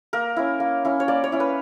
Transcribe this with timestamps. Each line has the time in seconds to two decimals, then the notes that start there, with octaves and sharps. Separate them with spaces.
0.13 A#3 A#4
0.36 C#4 E4
0.60 A#3
0.85 C#4 E4
1.00 C#5
1.08 A#3 D5
1.24 C#5
1.32 C#4 E4
1.40 B4